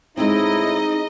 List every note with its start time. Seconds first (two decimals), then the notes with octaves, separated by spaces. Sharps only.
0.17 A2 G#3 C4 D#4 E4 D#5